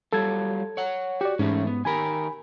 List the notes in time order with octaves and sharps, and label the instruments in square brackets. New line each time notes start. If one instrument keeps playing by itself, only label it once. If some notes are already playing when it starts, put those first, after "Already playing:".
[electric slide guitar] F#3 G3 F4 [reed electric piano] A4 G#6
[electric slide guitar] C#5 F#5
[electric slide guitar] F#4 [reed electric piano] G4 D5
[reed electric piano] G#2 [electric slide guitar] E3 A3 C#4
[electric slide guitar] B3
[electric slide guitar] D#3 G4 A#4 [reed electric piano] G#5 B5